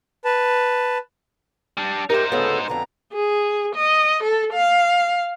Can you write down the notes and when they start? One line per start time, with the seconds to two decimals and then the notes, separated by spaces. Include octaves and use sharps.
0.25 B4 A5
1.77 G3 D4
2.10 D#4 G4 A#4 C5 D#5 E5
2.32 D2 C#3 B3 A4
2.68 F2 D3 B3 A#5
3.13 G#4
3.75 D#5
4.23 A4
4.53 F5